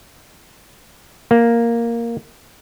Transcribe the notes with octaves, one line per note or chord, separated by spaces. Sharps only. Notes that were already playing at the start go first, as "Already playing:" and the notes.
A#3